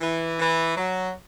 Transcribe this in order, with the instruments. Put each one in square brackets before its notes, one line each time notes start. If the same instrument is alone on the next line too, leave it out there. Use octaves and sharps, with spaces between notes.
[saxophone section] E3
E3
F#3